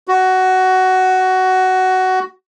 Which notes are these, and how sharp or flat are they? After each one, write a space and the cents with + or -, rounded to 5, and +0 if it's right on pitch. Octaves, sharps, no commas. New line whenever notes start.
F#4 +15